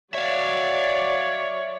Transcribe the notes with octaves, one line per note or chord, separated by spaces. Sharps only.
F#3 C#5 D5 E5 F5